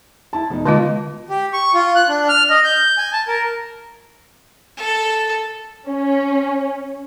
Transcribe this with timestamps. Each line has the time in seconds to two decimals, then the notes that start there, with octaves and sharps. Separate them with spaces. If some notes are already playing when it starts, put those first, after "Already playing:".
0.33 E4 A5
0.50 E1 D#4
0.65 D3 G#3 F4 D#5 A5
1.30 G4
1.53 C#6
1.74 F4
1.95 F#6
2.08 D4
2.29 F6
2.50 D#5
2.64 G6
2.98 G#5
3.13 A5
3.28 A#4
4.77 A4
5.88 C#4